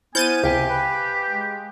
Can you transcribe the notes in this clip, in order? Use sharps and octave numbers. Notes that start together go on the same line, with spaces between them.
B3 E4 C5 G#5 F6 G6 A6 D#7
C#2 C3 G4 F5 G5 G#5
B4
G#3